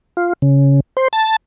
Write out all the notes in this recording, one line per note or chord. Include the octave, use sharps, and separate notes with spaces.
F4
C#3
C5
A5